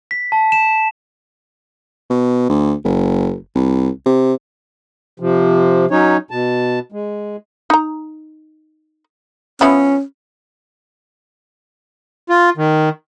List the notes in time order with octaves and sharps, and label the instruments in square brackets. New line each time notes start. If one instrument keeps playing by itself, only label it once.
[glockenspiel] B6
A5
E7
[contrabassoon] B2
D2
F#1
C2
C3
[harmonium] C3 F3
F#3 C#4 D#4 C#5
B2 A5
G#3
[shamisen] D#4 A#5
[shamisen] F3 B3 E4 [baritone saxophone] C#4
[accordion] F4
D#3